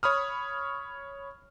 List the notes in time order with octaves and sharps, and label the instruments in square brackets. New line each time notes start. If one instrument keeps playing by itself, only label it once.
[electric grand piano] C#5 B5 D#6 F6